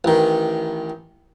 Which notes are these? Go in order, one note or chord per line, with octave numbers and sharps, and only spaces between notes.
A1 D#3